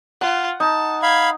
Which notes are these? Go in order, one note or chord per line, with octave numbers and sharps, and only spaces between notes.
F4 F#5
D#4 A5
F5 B5 G#6